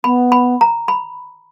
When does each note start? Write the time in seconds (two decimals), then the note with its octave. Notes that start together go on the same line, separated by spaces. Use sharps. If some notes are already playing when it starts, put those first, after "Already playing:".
0.04 B3 B5
0.32 B5
0.61 A#5
0.88 B5